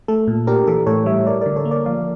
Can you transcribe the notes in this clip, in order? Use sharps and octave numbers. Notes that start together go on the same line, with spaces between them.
A3 A4
A#2
D4 G4 A#4
E3 A4
A2 A4 C#5
G3 C#5 E5
G3 A#4 D5
D3 A#4 D5
A4 C#5
A#3
A#4 D5
F3 D5 F5